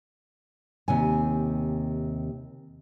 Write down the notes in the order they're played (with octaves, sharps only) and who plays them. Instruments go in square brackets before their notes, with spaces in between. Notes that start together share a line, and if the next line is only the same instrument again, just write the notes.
[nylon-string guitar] D#2 C3 G#5